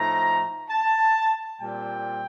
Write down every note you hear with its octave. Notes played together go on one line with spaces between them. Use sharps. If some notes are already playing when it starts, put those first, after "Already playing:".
Already playing: A2 F3 A3 D#4 A#5
A5
A#2 G3 C4 G5